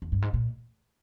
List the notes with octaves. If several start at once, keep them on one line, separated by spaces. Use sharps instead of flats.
E2
G2
G#2
A#2